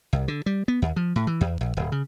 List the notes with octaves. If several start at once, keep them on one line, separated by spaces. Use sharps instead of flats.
C2
D3
G3
B3
D#2
F3
A2
E3
E2
A#1
D1
C#3